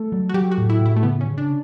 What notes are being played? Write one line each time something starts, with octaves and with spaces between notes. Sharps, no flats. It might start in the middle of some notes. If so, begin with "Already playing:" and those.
Already playing: A3 A4
F#3
F#4
F#3 G4
F#4
A2
E4
A2 E4
A3
C#3 B3
C#4
C#3
D4